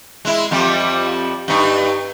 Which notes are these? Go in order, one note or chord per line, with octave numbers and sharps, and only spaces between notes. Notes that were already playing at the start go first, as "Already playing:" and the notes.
G#3 E4
F2 F3 G3
G2 D#4